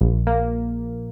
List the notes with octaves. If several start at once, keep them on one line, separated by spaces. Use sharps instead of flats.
A#1
A#3